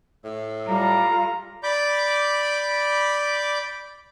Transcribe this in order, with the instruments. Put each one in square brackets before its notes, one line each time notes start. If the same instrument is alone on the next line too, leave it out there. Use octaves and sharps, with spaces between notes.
[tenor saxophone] A2 [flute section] E6
[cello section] G3 [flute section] F4 A4 F5 [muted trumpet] A#5
[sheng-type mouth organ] D5 B5 D6 G6